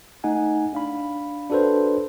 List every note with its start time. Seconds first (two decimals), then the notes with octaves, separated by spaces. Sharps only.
0.24 A3 D#4 F#5 G#5
0.73 D4 F5 B5
1.50 D4 F#4 A4 B4 C5